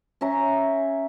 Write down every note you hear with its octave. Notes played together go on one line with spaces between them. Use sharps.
C#4 E5 A#5